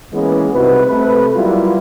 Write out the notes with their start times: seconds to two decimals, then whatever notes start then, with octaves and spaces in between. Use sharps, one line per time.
0.13 E3 G#3 A#3 B3 C#4 E4
0.54 C2 C3 D#4 F#4 B4
0.87 C3 A3 B4
1.36 F#3 G3 A#3 B3 E4 F4